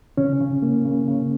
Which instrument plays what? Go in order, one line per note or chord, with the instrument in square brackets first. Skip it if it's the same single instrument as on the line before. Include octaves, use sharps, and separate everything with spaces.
[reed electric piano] C#3 C#4
C#3
A#3
C#3
C#3